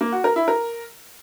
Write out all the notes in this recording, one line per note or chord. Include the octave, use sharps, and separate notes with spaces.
A#3
F#4
A#4
E4
A#4